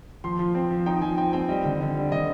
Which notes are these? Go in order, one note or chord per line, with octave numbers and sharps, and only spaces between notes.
F3 C6
F3
C4
F3
D#4 G5
F3 G#5
C4 G5
C4 G5
G3 D#5
D3
D3
G3
D3 D#5